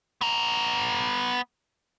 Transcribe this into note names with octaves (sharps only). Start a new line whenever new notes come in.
B3 A#5